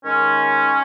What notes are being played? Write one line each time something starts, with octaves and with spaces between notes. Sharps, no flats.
D#3 G#3 C#4